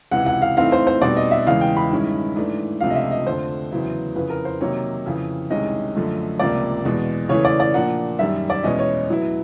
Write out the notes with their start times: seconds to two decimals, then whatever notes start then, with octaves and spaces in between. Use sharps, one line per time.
0.12 C#2 C3 E3 F#5
0.26 F#5
0.42 F5
0.57 A2 E3 A3 C4 D#4 F5
0.72 C5
0.87 C5
1.01 B2 G3 C4 D#4 D5
1.17 D#5
1.31 E5
1.47 E2 C#3 E3 G#3 F5
1.61 G5
1.77 B5
1.91 G2 D#3 G#3 C#4 E4
2.36 G#2 E3 A3 D4
2.81 C#2 C3 F3 A3 D4 F5
2.90 D#5
2.95 E5
3.11 D#5
3.27 F2 D3 F3 A3 C5
3.71 E2 C#3 F#3 B3 E4
4.16 F2 C#3 E3 B4
4.30 A#4
4.45 C5
4.61 C3 D#3 F#3 A#3 D#4 C#5
5.06 F2 C#3 E3
5.50 C2 C3 D#3 G#3 C#4 D#5
5.95 F#2 D3 F3 A3
6.40 C#2 C3 F3 A#3 D5
6.85 E2 B2 G#3
7.29 C#3 E3 A3 C#5
7.45 D5
7.60 D5
7.74 A#2 F3 A#3 D4 F#5
8.19 F#2 D#3 G3 E5
8.50 D5
8.63 E2 B2 G#3 C#4 E4 D#5
8.79 C#5
9.10 A2 F#3 B3 E4